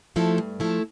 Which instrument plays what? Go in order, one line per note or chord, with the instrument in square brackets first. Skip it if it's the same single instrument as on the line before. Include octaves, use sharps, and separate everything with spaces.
[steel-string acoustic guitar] F3 A3 E4 A4
G2
F3 A3 E4 A4